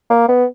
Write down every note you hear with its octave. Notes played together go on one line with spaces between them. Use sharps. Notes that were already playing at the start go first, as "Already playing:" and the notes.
A#3
B3